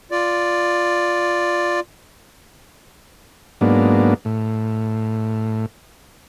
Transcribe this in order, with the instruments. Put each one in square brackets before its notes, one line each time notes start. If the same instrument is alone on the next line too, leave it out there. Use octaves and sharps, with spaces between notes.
[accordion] F4 D5
[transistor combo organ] G#2 F#3 A#3 B3 D4
A2